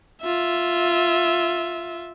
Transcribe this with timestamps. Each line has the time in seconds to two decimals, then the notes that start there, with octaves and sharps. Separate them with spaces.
0.22 F4 E5